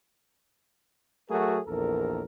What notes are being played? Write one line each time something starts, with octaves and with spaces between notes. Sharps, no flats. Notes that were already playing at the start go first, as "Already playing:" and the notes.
F#3 A3 F#4 G#4 A#4
A#1 E2 A4 A#4